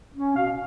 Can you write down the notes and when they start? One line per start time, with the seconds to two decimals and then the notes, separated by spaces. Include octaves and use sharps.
0.15 C#4
0.36 B2 F5